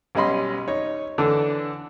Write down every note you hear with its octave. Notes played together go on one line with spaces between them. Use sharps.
B1 G3 C#4 D#5 B5 C6
D#4 C#5
D3 E3 D4